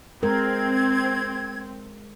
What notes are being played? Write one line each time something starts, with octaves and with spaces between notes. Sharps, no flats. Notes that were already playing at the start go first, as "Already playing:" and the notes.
G#3 C4 A#4 G#6